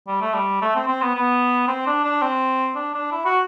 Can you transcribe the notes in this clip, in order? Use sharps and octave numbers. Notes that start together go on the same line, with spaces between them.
G3
A3
G3
A3
C4
C4
B3
B3
C4
D4
D4
C4
D4
D4
E4
F#4